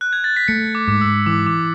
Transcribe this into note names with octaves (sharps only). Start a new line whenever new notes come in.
F#6
G#6
A6
B6
A3 C#7
D6
G#2 D6
E6
E3 D6
D6